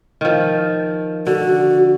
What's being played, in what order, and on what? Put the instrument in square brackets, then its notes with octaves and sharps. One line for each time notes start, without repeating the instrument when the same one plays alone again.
[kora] D#3 F3
[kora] D3 [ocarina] F#4